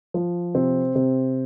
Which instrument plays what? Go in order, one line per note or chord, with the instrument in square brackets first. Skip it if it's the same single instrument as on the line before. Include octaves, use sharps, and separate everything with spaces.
[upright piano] F3
C3 C4
C3